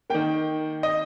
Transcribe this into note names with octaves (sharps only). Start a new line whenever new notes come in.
D#3 A#3 G5
D#5